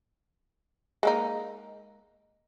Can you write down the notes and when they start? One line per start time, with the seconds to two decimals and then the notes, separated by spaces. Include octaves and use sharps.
1.03 G#3 A#3 D#4